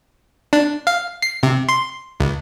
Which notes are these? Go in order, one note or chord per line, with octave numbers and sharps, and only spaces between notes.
D4
F5
C7
C3
C6
C#2